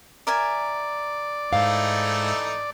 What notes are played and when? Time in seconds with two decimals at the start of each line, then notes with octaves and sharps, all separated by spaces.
0.27 A#4 D5 E5 G#5
1.53 G#2 E3 A3 D#4 F5